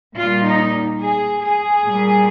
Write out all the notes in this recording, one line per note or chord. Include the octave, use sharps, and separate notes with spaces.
A#2 G3 F4
D#4
G#4
G#4
A#2 G3